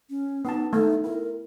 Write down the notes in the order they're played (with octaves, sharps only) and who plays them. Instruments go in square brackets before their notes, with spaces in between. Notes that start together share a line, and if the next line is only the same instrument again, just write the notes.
[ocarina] C#4
[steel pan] B3 A5 [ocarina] D#4
[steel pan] A3 [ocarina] D#4
[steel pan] E4 [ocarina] A#4